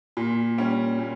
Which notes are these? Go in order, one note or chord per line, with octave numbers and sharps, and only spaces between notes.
A#2
G3 C#4
A#2